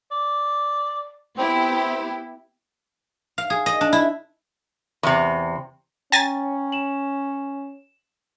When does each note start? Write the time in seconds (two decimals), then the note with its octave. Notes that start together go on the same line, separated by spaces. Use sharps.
0.11 D5
1.38 B3 C4 E4 G4
3.38 F5
3.50 G#4
3.66 D#5
3.81 D4
3.93 E4
5.03 E2 C3
6.12 C#4 G5 G#5 A#5 A6
6.72 E7 F#7